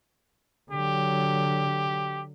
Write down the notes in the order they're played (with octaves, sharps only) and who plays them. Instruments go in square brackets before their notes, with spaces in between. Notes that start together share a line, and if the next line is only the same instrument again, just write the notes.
[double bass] D3 F#3 [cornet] G4